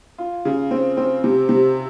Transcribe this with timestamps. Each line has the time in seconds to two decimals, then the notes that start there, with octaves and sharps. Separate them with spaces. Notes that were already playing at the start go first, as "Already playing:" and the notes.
0.18 F4
0.45 C#3
0.71 C4
0.97 C4
1.24 C3
1.49 C3